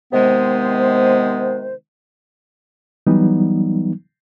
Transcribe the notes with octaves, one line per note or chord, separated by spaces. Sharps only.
C3 D#3 G#3 B3 C5
E3 F#3 G3 B3 D#4